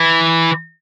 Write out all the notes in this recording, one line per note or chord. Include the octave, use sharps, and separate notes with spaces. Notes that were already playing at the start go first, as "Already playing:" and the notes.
Already playing: E3